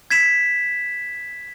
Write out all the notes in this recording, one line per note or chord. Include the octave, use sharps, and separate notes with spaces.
G#6 B6 E7